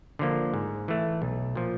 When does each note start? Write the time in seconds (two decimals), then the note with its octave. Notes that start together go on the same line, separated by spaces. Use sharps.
0.19 D3 F3 A#3
0.54 G#2
0.88 E3 A3
1.22 B1
1.55 A#2 F3